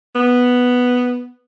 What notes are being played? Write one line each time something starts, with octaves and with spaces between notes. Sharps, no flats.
B3